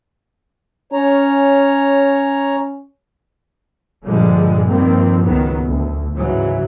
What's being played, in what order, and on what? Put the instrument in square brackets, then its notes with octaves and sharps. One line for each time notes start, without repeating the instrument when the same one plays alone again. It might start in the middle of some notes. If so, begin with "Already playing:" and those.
[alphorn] C#4 [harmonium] C#5 A#5
[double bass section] G2 A#2 D3 F3 G3 G#3
G2 D#3 F3 G3 A#3 C4
C#2 G#2 D#3 F#3 B3
D2
G#2 C#3 E3 F#3